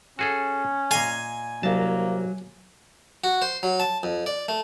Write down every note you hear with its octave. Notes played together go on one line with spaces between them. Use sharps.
C#4 F#4 G#4 A4
A#2 D#5 F5 G#5
C2 F#3 A#3 A5
F#4
C5
F#3
A5
F2
D5
A3